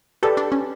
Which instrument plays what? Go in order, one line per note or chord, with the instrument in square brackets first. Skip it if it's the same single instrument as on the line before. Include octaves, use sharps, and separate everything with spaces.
[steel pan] G4 B4 D5 [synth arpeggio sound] A4
[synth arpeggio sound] D4
C#4